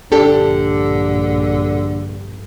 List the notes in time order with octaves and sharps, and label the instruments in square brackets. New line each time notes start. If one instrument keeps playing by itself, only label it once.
[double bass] A#1 G2 [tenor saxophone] D3 [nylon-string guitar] D4 G4 A4